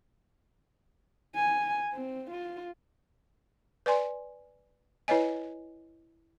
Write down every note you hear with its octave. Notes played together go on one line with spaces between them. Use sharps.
G#5
C4
F4
B4 D5 G#5 C6
E4 B4 C#5 D#5 G#5